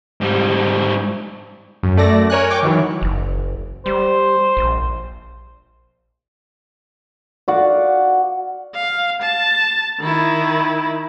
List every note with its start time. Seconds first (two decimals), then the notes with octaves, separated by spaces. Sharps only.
0.21 G#2 G3
1.83 F#2
1.96 F#2 A3 D5 A#6
2.30 A#4 C#5 G#5 F#6
2.50 G5 C#6 D6
2.63 D#3 E3 F#3
3.01 F#1
3.86 G3 C5
4.57 A#1
7.48 F#4 D5 F5 F#5
8.75 F5
9.22 A5
10.00 D#3 E4